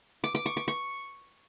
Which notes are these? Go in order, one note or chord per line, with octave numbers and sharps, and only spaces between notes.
D6
D6
C#6
D6
C#6